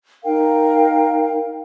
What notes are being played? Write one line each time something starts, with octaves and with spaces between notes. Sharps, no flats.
D#4 A#4 F5 G5